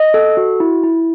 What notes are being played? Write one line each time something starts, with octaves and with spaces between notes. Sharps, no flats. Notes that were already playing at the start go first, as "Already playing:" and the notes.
Already playing: D#5
A4
F#4
E4
E4